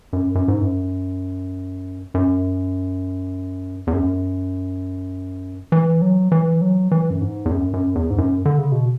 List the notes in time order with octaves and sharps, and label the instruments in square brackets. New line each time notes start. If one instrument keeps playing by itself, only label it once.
[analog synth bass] F#2
F#2
G#2
F#2
F#2
E2
F#2
E3
F#3
E3
F#3
E3
F#2
G#2
E2
F#2
F#2
E2
G#2
F#2
D3
C#3
B2